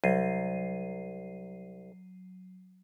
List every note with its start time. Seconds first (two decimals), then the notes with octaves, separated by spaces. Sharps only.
0.04 C2 F#3 C7 D#7